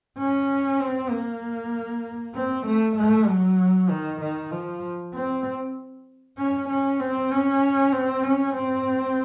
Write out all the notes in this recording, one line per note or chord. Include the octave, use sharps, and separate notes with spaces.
C#4
C4
A#3
C4
A3
A3
F#3
D#3
D#3
F3
C4
C#4
C#4
C4
C#4
C4
C#4
C4